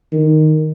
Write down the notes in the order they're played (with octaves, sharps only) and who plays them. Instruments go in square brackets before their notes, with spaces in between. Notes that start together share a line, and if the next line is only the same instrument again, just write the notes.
[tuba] D#3